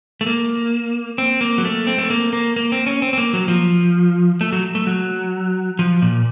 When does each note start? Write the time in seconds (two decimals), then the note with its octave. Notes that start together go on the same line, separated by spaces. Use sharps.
0.21 A3
0.27 A#3
1.18 C4
1.41 A#3
1.58 F#3
1.65 A3
1.87 C4
1.98 A3
2.10 A#3
2.33 A#3
2.56 A#3
2.72 C4
2.86 C#4
3.02 C4
3.13 C4
3.18 A#3
3.33 F#3
3.48 F3
4.41 A3
4.52 F#3
4.75 A3
4.87 F#3
5.79 F3
6.02 A#2